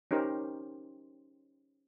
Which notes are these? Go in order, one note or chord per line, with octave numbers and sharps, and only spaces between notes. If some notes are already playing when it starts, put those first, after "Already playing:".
C#4 D#4 G4 A#4 C5